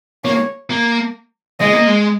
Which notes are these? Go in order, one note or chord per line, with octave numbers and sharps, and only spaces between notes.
A#3 C#5
A#3
G#3 D#5
A#3
G#3